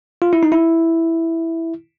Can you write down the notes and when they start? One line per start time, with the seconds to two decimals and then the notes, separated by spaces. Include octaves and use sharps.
0.22 F4
0.33 E4
0.43 D#4
0.52 E4